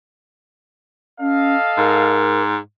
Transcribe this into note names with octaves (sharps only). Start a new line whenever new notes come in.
C#4 A4 D#5 F5
G#2 A#4